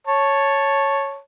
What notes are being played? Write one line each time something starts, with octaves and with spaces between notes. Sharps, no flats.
C#5 A5